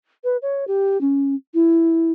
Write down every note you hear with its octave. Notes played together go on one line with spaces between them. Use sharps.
B4
C#5
G4
C#4
E4